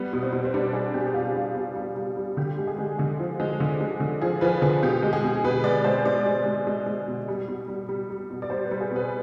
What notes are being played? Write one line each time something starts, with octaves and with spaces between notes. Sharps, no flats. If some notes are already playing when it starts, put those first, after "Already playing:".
Already playing: G3 B3
B2
C4
B2
C4
G3 D4
G3 G#4
B2 G4
G4
B2 F4
G3
B2
G3
G3
G3
D3 G4
G#3
G#4
G#3
D3 G#4
F3
G#3
D3
G#3
D3
F3 G#4
F3 B4
D3 G#4
B2 G4
G#3
G#4
B2
B2 B4
G#3 D5
G#3 C5
G#3 D5
G#3
G#3
G#3
G#3
B2
G3
B2
G3
G3
G3
B2
D5
G3 C5
B4
G3
G#4
B2 B4